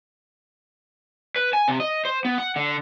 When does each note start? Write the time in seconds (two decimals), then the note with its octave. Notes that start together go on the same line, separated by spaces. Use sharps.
1.36 B4
1.53 G#5
1.68 C3
1.80 D#5
2.05 C5
2.25 B3
2.38 F#5
2.56 D3